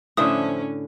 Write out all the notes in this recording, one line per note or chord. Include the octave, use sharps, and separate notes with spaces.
F2 A2 D3 C#4 D4 C5 E5 D#6